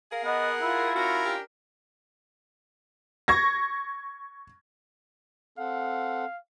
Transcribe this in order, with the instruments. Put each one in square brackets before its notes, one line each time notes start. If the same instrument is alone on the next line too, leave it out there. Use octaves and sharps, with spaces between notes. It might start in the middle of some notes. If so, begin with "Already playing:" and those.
[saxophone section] G#4 A#4 [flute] F5
[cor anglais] B3 [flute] D#5 [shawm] F#5
[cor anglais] E4 [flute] F4
[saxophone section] C#4 F#4 [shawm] A#4
[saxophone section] C#4 D4 G4
[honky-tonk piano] C#6 G#6 A#6
[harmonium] C4 A4 F#5 [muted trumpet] F5